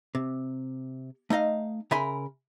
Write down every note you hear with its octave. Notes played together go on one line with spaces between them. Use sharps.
C3
A3 D#4 D#5 F5
C#3 A#4 E5 G#5 B5 C6